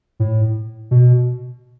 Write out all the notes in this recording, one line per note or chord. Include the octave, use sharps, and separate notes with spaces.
A2
B2